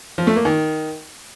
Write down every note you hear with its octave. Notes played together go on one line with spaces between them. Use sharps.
F3
A3
A#3
D#3